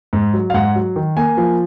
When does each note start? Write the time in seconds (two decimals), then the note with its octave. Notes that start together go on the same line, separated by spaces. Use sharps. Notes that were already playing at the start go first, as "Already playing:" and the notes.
0.13 G#2
0.34 F#3
0.50 F5
0.54 G#2 F#5
0.76 F#3
0.96 D#3
1.17 A#3 G#5
1.37 F3